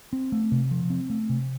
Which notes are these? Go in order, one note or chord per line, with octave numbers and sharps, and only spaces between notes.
C4
A3
C3
F3
C4
A3
C3